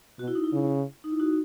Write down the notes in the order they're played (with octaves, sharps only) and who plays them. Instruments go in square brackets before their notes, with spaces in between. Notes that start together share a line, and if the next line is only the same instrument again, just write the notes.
[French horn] B2 [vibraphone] F#4
[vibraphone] E4
D#4
E4
[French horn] C#3
[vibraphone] D#4
E4
D#4 F#4